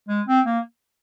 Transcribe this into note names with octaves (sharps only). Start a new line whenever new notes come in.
G#3
C4
A#3